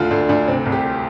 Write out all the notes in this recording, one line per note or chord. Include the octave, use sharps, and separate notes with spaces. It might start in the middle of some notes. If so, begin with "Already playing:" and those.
Already playing: D2 D3 F4
D2 D4
D2 D4
C3 C4
C2
G4